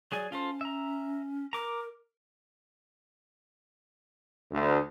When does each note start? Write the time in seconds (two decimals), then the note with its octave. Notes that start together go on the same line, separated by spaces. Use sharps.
0.12 F#3 G#4 D5 G#5
0.32 C#4 F4 A4 C5
0.61 E5 A#5
1.53 A#4 A#5 D6
4.51 D2